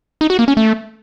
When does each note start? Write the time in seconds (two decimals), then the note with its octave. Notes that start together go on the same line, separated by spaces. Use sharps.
0.21 D#4
0.30 F#4
0.39 A#3
0.48 C#4
0.57 A3